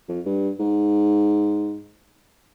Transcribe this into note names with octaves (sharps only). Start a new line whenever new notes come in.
F2
G2
G#2